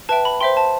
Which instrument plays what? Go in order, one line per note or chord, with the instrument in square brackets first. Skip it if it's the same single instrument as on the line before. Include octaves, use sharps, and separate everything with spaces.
[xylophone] B4 E5 G5 A5
B5
C5 E5 G5 C6
A5